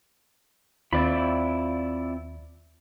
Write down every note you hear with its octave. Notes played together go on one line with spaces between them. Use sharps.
D#2 C4 E4 F4 D5 B5